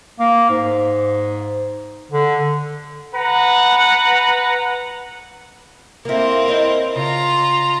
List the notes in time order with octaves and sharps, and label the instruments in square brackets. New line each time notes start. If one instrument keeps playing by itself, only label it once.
[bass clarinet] A#3
G#2
D3
[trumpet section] B4 F#5 A#5
[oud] A#3 E4 [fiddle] C4 A#4
[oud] E4 C#5 D#5
[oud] C#3 [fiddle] F4 A#5